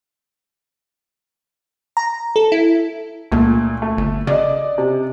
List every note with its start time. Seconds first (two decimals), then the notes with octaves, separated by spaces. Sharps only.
1.97 A#5
2.36 A4
2.52 E4
3.32 C#2 A#2 A3
3.82 A3
3.97 G1
4.27 C#3 D5 D#5
4.78 C3